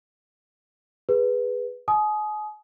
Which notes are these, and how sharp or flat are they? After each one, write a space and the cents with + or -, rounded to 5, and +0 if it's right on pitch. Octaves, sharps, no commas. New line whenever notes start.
G#4 -15 B4 -5
G#5 +40 D#6 +0